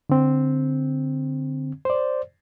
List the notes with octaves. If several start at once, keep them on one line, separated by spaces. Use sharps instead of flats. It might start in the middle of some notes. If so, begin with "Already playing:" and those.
D3 C4
C5 D5